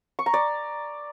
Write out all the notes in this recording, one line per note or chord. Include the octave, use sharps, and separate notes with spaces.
C#6
A#5
D5